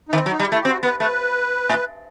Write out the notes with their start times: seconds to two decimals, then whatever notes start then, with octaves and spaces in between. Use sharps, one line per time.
0.09 D#4
0.13 D#3 C4
0.26 F#3
0.31 D#4
0.39 G3
0.48 A3 E4
0.61 G4
0.65 C4 F#4
0.83 B3 B4
1.00 A3 B4
1.69 A2